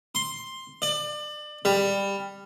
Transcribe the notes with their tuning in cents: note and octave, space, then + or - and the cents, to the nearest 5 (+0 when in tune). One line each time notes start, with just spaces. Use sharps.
C6 +5
D5 +30
G3 +15